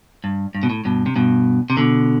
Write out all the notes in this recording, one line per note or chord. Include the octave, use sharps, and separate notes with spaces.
G2
G2
B2
A2
G2 B2
C3
G2 B2
C3
B2 D3